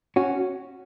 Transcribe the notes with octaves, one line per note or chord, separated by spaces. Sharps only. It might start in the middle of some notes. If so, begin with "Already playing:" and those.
C#4 F#4